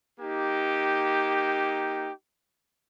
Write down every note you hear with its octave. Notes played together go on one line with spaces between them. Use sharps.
A#3 D#4 G4